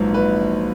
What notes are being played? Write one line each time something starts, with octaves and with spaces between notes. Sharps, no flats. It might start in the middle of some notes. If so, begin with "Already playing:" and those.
Already playing: A#1 G#2 F#3 B3
B4